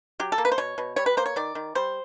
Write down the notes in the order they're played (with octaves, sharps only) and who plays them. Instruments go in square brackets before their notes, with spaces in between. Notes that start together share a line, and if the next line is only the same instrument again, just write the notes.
[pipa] F#3 G4
A4
A#3
B4
C5
B2 C#5
B2
G3 C#5
B4
A#3 C5
C#5
D#3 D5
D#3
G3 C5